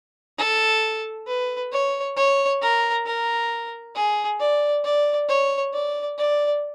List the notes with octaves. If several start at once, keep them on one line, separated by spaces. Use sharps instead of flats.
A4
B4
C#5
C#5
A#4
A#4
G#4
D5
D5
C#5
D5
D5